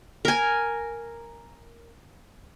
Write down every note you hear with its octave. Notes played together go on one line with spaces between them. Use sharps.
A#4 G#5